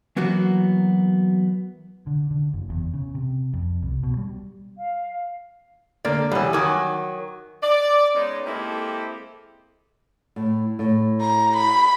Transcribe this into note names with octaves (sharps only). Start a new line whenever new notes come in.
E3 F#3 A#3 B3 F#4
D3
D3
F#1
E2
C#3
C3
F2
C2
B2
G3
F5
D3 A#3 D5
B2 E3 G3 C#4
D#3 F#3 G#5 D6 D#6
D5
G#3 B3 C#4 D#4
G#3 A#3 C4 E4 G4 A4
A2
A2
A#5
B5